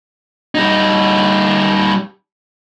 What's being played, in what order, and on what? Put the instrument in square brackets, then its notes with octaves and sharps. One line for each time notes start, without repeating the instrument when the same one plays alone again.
[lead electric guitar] G3 D#4